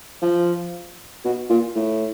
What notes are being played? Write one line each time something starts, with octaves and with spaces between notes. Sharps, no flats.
F3
B2
A#2
A2